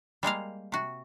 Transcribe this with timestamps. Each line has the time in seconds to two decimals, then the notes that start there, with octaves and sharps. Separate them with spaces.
0.23 G3 G#3 A#3 F5
0.72 C3 F#4